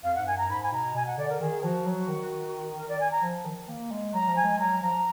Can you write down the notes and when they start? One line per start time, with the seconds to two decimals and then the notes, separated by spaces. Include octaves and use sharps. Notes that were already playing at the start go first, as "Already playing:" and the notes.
0.03 F2 F5
0.15 G#2 F#5
0.26 F#2 G#5
0.38 A#5
0.49 G#2 B5
0.62 G#5
0.72 B2 A#5
0.95 B2 G#5
1.06 F#5
1.18 D3 D5
1.29 A#4
1.41 D#3 G#4
1.63 F3 F#4
1.86 F#3
2.08 D#3
2.77 A#4
2.89 D5
3.00 G#5
3.11 A#5
3.22 F3
3.45 D#3
3.68 A#3
3.91 G#3
4.14 F#3 A#5
4.28 F3
4.36 G#5
4.44 G#3
4.59 F#3 A#5
4.82 F3 A#5